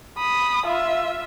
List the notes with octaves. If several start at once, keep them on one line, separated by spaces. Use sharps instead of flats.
B5 D#6
F4 E5